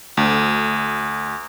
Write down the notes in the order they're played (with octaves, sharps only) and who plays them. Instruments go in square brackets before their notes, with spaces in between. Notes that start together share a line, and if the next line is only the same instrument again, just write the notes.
[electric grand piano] D2